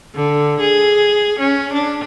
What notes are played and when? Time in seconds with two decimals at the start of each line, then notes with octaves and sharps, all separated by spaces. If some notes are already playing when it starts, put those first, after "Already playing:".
0.15 D3
0.60 G#4
1.39 C#4
1.73 D4